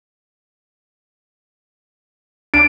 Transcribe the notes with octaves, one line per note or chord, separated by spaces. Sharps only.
D4 D7